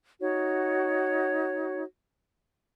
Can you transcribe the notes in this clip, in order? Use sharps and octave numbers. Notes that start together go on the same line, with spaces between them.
D#4 F#4 C#5